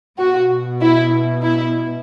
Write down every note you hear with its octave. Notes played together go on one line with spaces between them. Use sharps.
B2 F#4
E4
E4